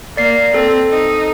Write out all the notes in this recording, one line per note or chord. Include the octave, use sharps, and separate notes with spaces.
A#3 D5 C7
C4 A4
D#4